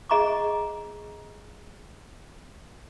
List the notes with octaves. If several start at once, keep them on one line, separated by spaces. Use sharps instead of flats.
G#4 D#5 A#5 C#6 D6